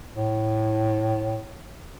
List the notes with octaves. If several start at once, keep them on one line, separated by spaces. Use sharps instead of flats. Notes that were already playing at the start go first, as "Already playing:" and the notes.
A2